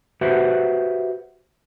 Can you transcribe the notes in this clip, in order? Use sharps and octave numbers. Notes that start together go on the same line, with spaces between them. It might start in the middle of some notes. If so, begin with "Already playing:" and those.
F#4 G4 B4 C5 E5 F#5